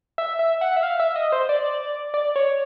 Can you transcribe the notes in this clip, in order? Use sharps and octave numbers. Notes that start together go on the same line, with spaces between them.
E5
E5
F#5
E5
F5
E5
D#5
C5
D5
D5
C#5